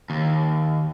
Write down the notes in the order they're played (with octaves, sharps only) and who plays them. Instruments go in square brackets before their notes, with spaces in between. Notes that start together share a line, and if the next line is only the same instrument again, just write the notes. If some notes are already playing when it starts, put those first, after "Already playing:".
[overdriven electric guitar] D#2